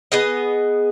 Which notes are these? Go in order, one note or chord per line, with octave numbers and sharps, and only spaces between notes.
B3 G#4 D#5